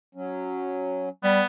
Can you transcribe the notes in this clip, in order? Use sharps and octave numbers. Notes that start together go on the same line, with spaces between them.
F#3 C#4
G3 B3